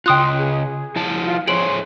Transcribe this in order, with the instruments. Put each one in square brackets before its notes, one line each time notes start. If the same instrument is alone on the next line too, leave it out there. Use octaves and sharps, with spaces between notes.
[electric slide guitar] C#3 F4 [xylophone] G5 D#6 F#6 [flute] C6
[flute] G#4
[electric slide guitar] F3 E4 A5
[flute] F4
[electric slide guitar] G#4 C5 C#5 [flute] C6 [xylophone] D7 F#7